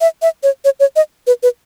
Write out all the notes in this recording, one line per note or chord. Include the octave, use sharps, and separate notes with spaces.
E5
E5
C#5
C#5
C#5
D#5
B4
B4